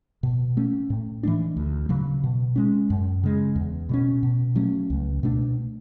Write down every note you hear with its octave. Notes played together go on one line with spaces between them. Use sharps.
B2
A3 C#4
A2
E3 A3 D4
D2
C#3 F#3
B2
G#3 C#4
F#2
C#3 G#3
E2
B2 G#3 C#4
B2
F#3 A3 C#4
C#2
B2 A3 D4